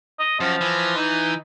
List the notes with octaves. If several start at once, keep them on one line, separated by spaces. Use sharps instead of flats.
D#5
F#2 F3
E3
D#4